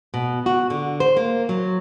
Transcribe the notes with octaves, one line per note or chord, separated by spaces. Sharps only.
B2
F#4
D3
C5
A#3
F#3